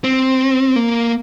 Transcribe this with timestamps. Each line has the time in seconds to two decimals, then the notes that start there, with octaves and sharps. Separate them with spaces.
0.04 C4
0.76 A#3